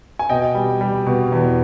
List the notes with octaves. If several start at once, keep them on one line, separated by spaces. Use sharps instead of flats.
G#5
B2 D#5 G5
G3
G3
B2
E2